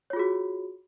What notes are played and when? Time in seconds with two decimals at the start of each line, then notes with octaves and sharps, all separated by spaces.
0.10 C#5
0.13 F4
0.16 G#4
0.19 F#4